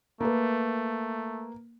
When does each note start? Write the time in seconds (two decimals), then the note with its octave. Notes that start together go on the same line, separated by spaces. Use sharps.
0.21 A3 A#3 B4